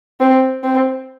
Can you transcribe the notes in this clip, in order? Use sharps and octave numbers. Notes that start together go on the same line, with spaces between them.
C4
C4